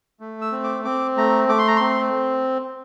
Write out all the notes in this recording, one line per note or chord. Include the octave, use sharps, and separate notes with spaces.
A3
E6
C4
D6
C4 D6
A3 A#5
A3 D6
C6
A#5
C4 C6